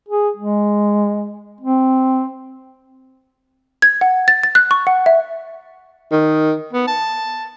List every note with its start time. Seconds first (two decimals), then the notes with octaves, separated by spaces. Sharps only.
0.09 G#4
0.37 G#3
1.61 C4
3.82 G#6
4.01 F#5
4.28 A6
4.44 A6
4.55 F#6
4.71 C#6
4.87 F#5
5.06 E5
6.12 D#3
6.73 B3
6.87 A5